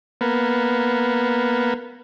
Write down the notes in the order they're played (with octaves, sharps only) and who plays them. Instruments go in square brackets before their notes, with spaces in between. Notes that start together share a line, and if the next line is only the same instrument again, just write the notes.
[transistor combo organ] A#3 B3